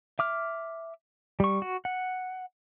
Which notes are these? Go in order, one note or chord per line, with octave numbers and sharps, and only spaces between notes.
E5 D6 F6
G3 C#6
F#4
F#5